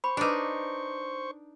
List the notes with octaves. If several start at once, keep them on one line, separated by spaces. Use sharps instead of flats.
C5 B5 C#6
D4 D#4 G#4 B4